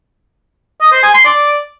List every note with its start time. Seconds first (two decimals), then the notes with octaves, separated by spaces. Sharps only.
0.81 D#5
0.92 C5
1.03 G#5
1.14 C6
1.25 D5